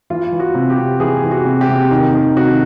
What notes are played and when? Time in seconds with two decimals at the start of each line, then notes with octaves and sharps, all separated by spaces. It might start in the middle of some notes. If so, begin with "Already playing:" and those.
0.10 E3 F4
0.32 E3
0.39 F#4
0.54 C3
0.70 G4
0.78 C3
1.00 E3 G#4
1.23 E3
1.31 F#4
1.45 C3
1.61 G4
1.68 C3
1.91 D#3
2.14 D#3
2.36 C3 F#4